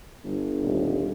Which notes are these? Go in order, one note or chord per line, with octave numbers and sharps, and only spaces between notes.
G1
D#1